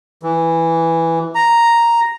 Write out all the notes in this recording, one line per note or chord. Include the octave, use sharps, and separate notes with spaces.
E3
A#5